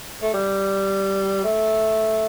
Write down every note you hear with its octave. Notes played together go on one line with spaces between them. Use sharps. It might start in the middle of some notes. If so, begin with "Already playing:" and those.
A3
G3
A3